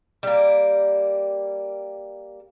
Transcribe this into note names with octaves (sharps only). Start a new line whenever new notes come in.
G3 A#3